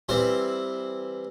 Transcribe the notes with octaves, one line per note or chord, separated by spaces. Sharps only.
E3 G3 C4 C5